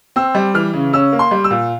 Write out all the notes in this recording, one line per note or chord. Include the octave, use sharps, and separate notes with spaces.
C4 E6
G3
E3 F6
C#3
C#4 E6
A#3
C6
G3
E6
A#2